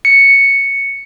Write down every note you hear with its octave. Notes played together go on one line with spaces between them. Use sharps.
C#7